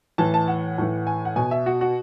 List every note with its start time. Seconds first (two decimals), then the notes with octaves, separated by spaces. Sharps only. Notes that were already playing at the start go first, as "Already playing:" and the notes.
0.18 A2 E3 A5
0.34 A5
0.48 F#5
0.78 A2 E3
1.07 G#5
1.25 F#5
1.36 B2 G#5
1.51 E5
1.66 F#4
1.81 F#4